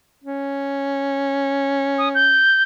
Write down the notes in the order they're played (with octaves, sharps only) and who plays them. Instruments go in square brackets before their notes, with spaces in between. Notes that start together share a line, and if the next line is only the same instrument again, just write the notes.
[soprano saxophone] C#4
[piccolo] D#6
G6